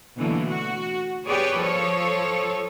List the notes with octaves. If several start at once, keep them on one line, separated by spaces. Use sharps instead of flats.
B2 D3 E3 F#3 A3 A#3
F#4
G4 G#4 B4 C#5 D5
F3 A4 C#5